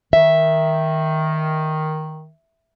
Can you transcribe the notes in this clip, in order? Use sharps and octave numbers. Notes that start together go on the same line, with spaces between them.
D#3 E5